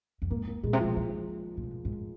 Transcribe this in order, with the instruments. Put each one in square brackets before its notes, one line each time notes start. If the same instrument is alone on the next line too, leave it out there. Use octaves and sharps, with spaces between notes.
[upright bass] F2
[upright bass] G#2 [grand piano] A#3
[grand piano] A#3
[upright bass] A#2 [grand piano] G#3
[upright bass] C3
[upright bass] A#2 [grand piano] F3
[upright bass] D#3
A#2
C3
G#2